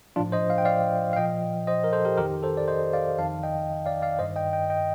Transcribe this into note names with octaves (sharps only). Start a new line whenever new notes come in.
A2 F3 D4 F4
C5 D#5
F5
G5
D5 F5
F5
A#2 F3 D#5 G5
C5 D#5
A#4
A4 C5
G4 A#4
F2 D#3 G4 A#4
A4 C5
D5
C5 D#5
D5 F5
F2 D#3 F5 A5
D#5 G5
D5 F5
D5 F5
G2 D#3 C5 D#5
D#5 G5
D#5 G5
D#5 G5